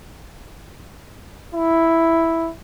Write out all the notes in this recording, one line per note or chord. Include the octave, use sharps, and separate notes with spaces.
E4